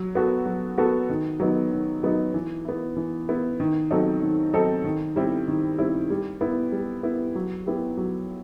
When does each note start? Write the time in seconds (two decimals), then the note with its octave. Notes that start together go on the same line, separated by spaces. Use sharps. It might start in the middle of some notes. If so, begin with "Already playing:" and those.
Already playing: F#3
0.15 B3 F#4 A4
0.46 F#3
0.78 B3 F#4 A4
1.09 D#3
1.40 F#3 B3 D#4
1.72 D#3
2.03 F#3 B3 D#4
2.34 E3
2.65 B3 E4
2.96 E3
3.29 B3 E4
3.60 D#3
3.90 F#3 C4 D#4 A4
4.22 D#3
4.53 F#3 C4 D#4 A4
4.84 D#3
5.16 G3 C4 E4
5.48 D#3
5.78 G3 C4 E4
6.10 G3
6.41 B3 E4
6.72 G3
7.03 B3 E4
7.35 F#3
7.66 B3 E4 G4
7.97 F#3